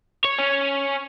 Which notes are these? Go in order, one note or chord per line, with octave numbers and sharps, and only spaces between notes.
C#5
C#4